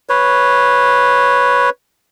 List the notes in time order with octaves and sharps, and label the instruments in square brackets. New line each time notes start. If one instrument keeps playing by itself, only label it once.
[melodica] B4 C#5